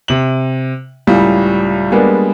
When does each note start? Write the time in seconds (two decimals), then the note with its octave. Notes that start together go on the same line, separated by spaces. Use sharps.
0.08 C3 F#7
1.07 C#2 A2 C#3 G3
1.92 G3 G#3 A#3 B3 D4